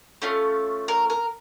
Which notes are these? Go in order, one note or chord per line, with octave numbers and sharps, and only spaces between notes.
A3 C#4 F4
A#4
A#4